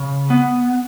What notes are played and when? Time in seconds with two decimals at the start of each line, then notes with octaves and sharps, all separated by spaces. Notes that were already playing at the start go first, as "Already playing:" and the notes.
Already playing: C#3
0.30 B3